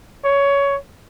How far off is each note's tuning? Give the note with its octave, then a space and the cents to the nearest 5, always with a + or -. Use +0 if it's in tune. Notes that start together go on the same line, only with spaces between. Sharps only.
C#5 +15